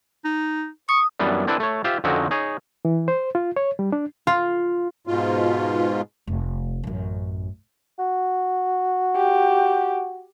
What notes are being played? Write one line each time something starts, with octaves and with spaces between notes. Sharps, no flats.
D#4
C#6 D#6
F#2 E3 G3 B3 D4
C4 D4 E4 A4 B4
A3 C#5
F4 G4 C5 E5
F2 D3 C4 C#4 D#4 F#4
D#4 G#4 C#5
E3
C5
F4
C#5
G3
D4
F4
G#2 B2 F4
F1
A1 F#2
F#4
G4